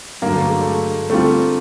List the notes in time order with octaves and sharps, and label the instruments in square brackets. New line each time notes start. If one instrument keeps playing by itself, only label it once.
[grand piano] G2 D3 F#3 [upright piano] A#3
[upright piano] A3
G#3
A3
[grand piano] D3 G3 C4 F4 [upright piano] A3